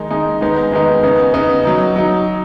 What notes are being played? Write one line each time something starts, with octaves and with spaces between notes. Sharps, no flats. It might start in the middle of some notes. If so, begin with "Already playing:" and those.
Already playing: D#3 G#3 D#4
D#3 G#3 D#4
D#3 G#3 B3 D#4
D#3 G#3 B3 D#4
C#3 B3 D#4
C#3 B3 D#4
F#3 D#4
F#3 D#4